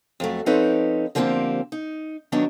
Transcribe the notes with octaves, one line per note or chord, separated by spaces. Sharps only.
F2 F#3 A3
F3 C4 C#4 D#4 A4 B4
D3 F3 A#3 C4 F#4 G4
D#4
D#3 F#3 B3 D4